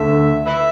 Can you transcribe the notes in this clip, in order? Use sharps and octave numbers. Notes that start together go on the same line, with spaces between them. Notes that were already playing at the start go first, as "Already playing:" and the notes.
Already playing: D2 D3 A3 E5
B4 E5